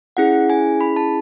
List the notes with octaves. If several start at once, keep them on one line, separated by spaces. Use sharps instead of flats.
C#4 E4 G#4 F#5
G#5
B5
A5